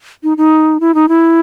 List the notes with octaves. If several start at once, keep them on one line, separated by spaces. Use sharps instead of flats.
D#4
D#4
E4
D#4
E4